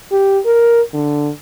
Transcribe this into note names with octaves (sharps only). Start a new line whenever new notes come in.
G4
A#4
D3